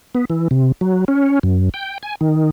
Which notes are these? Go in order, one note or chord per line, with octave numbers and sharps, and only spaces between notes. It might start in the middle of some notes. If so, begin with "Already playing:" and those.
B3
E3
C3
F#3
C#4
F#2
G5
G#5
D#3